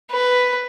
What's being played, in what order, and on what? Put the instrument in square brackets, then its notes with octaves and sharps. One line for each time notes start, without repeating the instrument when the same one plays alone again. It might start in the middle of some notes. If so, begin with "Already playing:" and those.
[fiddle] B4